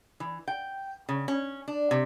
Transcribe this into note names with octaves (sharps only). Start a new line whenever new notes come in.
E3
G5
C#3
C#4
D4
C3